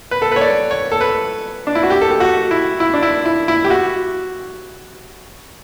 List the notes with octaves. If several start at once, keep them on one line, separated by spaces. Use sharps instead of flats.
B4
A4
B4
C#5
D5
C#5
A4
B4
D4
E4
F#4
G4
A4
G4
F#4
E4
E4
D4
E4
E4
E4
G4
F#4